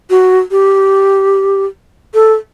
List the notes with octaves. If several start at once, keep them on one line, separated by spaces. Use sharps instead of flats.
F#4
G4
A4